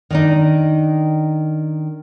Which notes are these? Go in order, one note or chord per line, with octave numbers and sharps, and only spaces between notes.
D#3 D4 D#4